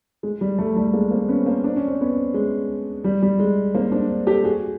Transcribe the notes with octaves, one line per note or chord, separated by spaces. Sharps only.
G#3
G3
G3 A3
G3 A3
G#3 A#3
A#3 C4
B3 C#4
A#3 C4
D4
C#4
C4
B3 C#4
G#3
G3
G3
G#3
A#3 C4
C4 D4
G4 A4
F#4 G#4